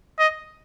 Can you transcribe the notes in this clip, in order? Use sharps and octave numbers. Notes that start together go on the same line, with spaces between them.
D#5